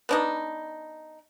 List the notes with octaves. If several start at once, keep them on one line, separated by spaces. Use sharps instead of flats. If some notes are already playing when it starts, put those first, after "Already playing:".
B3 D4 D#4